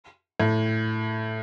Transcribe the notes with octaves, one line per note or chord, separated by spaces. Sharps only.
A2